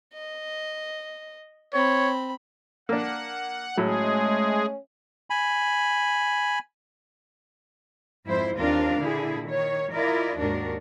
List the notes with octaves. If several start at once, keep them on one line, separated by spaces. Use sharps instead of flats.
D#5
C4 C#5 B5
A#3 D4 F#5
A2 F#3 G#3 A3 C#4 G#4
G#5 B5
F2 G#2 E4 C5
D#2 C4 D4 F4 A#4 F5
A#2 D3 E4 G#4
D#3 C#5
E4 F4 A#4 D5 D#5
D#2 G#2 D#3 D4 F#4 A#4